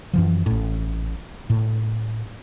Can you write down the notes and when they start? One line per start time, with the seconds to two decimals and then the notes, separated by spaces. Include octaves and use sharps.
0.13 F#2 E3 F3
0.46 A1 A2
1.50 A2